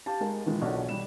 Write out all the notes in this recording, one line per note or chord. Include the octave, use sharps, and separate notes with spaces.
G4 F5 A5
G#3 G#4 A#4
A#2 D#3 E3 G#3
B1 D4 F#5
G3 E7